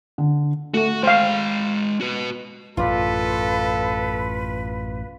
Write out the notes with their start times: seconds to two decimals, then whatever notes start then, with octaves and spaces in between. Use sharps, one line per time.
0.18 D3
0.74 A3 F#4 F#5
1.03 G#3 C5 F5 G5
2.01 F#4 B4
2.77 A1 F#2 B2 F4 A4 B4 D5